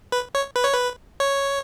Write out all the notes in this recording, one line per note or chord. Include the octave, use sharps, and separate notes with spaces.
B4
C#5
B4
C#5
B4
C#5